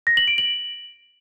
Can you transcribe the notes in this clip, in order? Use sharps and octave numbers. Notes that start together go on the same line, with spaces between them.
A#6
F#7
D7
F#7